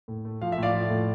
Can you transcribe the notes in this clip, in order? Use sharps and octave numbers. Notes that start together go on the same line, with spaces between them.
A2
A3
F3 F5
E5
A2
D5 F5
F3
A2